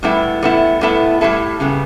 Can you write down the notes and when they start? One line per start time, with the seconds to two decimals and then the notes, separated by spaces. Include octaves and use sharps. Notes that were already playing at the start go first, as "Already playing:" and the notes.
0.03 A2 G3 B3 E4 A4
0.43 A2 G3 B3 E4 A4
0.81 A2 G3 B3 E4 A4
1.21 A2 G3 B3 E4 A4
1.60 C#3 G3 B3